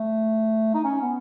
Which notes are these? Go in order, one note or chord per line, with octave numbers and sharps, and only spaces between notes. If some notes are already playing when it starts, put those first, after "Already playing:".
Already playing: A3
D#4
C#4
B3